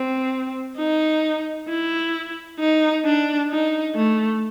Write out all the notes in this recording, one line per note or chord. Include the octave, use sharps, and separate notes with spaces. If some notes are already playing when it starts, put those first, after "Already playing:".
Already playing: C4
D#4
E4
D#4
D4
D#4
A3